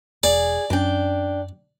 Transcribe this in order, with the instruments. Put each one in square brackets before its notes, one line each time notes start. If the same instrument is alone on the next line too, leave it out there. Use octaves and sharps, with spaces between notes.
[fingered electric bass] E1 [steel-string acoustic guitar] G#4 [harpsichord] D5
[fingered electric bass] F#2 C#4 [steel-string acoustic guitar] D4 G5